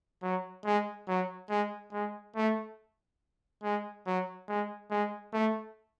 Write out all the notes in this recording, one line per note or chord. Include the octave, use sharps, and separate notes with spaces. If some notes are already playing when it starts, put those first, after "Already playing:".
F#3
G#3
F#3
G#3
G#3
A3
G#3
F#3
G#3
G#3
A3